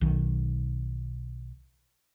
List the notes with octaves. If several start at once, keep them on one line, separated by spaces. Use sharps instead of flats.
B1 D#3